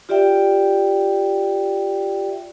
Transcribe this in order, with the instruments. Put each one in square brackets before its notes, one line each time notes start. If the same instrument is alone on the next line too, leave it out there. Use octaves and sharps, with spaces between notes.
[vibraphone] F4 G4 D5 E5 G5